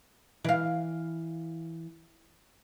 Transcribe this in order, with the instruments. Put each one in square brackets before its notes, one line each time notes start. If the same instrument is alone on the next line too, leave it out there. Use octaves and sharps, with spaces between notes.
[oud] E3 F5